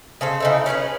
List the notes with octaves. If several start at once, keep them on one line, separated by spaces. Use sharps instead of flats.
C#3 A4 C5
C#3 D#4 E4
C#4 D4 G#4 B4